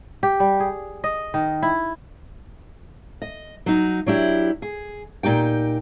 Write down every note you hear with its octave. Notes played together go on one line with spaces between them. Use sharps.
G4
G3
G#4
D#5
D#3
E4
D#5
F#3 D#4
F#3 D4 E4 G4
G#4
A#2 D#4 G4 G5